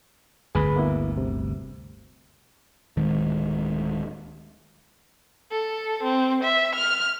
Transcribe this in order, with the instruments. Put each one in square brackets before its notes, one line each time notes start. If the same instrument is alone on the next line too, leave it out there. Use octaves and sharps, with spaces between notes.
[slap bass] G1 D2 [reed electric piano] G#4 B4 B5
[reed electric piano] A#3 B3 E4
C3
[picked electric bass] D1 D#3 G#3
[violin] A4
C4
E5
F6